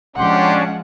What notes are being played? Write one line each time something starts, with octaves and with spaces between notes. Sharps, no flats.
F3 G#3 C#4 D4 G4 F#5 C6